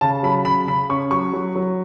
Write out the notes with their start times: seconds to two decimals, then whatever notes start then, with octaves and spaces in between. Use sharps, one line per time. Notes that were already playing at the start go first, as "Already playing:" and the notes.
0.01 C#3 A5
0.23 F#3 B5
0.45 C#3 B5
0.67 C#3 B5
0.89 C#4 C#6
1.11 F#3 C#6
1.33 F#3
1.56 F#3